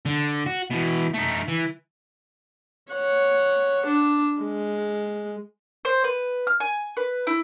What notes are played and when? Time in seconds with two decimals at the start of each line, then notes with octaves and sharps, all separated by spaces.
0.06 D3
0.46 F#4
0.70 B2 E3
1.14 A3 D#4
1.49 E3
2.93 C#5 F#5
3.87 D4
4.42 G#3
5.85 C5
6.04 B4
6.47 F6
6.60 G#5
6.97 B4
7.27 E4